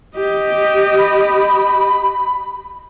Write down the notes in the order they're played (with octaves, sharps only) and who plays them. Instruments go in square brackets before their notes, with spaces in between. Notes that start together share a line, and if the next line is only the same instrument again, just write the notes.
[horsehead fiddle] G4 D#5
[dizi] B5